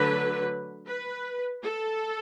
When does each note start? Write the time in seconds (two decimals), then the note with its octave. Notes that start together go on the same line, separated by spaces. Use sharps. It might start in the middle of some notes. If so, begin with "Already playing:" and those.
Already playing: D3 F#3 A3 B4
0.87 B4
1.63 A4